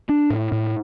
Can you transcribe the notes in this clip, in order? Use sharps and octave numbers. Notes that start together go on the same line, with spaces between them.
D4
A2
A2